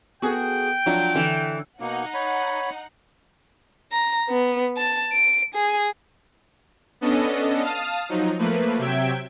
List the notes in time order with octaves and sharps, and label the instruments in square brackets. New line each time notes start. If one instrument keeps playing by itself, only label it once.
[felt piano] B3 A4 [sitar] F#4 G#4 [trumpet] G5
[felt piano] F3 D4 F#5 [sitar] F#3
[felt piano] D3 [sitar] E3
[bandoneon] B2 A#3 [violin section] D#4 F#5
[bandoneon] C#5 B5
[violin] A#5
B3
A5
D7
G#4
[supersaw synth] B3 C#4 D4 A4 D#5
F5 A5 D#6 F6
F3 F#3 D#4
F3 A3 A#3 B4
C3 F#3 E5 G5 G#6 D7